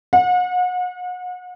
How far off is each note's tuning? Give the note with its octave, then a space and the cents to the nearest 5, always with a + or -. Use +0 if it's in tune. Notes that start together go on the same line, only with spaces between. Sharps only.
F#5 -35